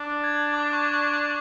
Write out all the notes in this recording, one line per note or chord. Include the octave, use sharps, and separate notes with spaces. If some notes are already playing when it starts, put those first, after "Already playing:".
Already playing: D4
G#6
D6
D6
C#6
C#6
C#6